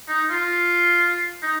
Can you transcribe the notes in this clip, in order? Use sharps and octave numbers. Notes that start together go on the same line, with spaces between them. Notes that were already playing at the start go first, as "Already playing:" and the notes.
D#4
F4
D#4